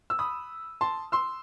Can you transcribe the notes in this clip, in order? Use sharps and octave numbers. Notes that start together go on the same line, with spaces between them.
E6
B5 D#6
A5 C6
C6 E6